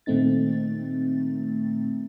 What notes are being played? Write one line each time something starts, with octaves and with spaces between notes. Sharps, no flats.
A#2 D#3 A3 C4 D#4 A6